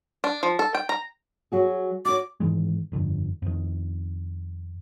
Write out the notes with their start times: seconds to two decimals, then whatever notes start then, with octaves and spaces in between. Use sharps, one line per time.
0.24 D4
0.43 F3
0.59 A4
0.75 G5
0.89 A#5
1.52 F#3 F#4 G#4
2.05 F#4 C#5 D6
2.40 G#2 D#3 E3 G#3
2.92 G1 F2 D3
3.42 F2 D#3